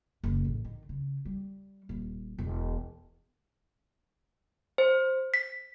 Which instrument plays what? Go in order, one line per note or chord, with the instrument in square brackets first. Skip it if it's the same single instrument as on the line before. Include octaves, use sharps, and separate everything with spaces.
[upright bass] F#1
A1
D#3
C#3
G3
D#1
E1
[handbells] C5
B6